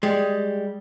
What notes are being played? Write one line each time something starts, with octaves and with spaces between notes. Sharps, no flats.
G3 G#3